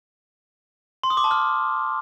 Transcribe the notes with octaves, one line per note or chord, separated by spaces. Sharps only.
C6
D#6
D6
A5
F6